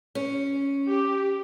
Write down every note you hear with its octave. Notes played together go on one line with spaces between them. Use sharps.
C#4
G4